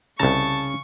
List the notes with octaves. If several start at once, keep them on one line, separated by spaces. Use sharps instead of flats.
C2 C#3 A5 A#5 C#6